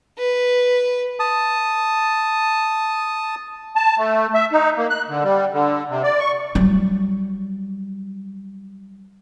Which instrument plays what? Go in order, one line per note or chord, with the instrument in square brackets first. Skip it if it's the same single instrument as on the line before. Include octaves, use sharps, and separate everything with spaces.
[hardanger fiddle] B4
[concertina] A5 D#6
[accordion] A5
A3
E5
D#4
A#3
F#6
D3
G3
D3
C3
D5
C#6
[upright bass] F#3 G3